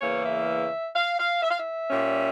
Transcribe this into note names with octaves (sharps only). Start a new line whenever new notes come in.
E2 C#3 E3 A#3 C#5
E5
F5
F5
E5
F5
E5
A#2 G3 C#4